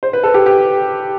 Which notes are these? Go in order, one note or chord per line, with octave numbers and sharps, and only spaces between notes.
C5
B4
A4
G4
G4